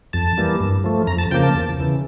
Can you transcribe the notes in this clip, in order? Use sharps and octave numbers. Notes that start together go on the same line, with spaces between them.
F2 A5
E3 G3 A#3
G2
F3 A3
F2 A#5
A5
C#3 F3 A#3 G5
A5
E2
C#3 E3